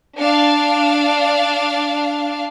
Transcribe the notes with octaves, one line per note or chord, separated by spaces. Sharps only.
D4 F5